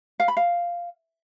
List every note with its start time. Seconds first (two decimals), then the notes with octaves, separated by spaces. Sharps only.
0.20 F5
0.28 B5
0.37 F5